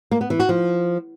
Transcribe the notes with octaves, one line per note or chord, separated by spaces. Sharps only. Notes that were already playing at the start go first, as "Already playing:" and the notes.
A#3
B3
E3
F#4
F3